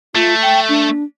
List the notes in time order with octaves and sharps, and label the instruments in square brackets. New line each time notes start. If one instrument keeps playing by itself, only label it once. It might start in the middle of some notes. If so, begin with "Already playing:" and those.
[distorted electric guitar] A3 [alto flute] F4
[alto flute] G5
D4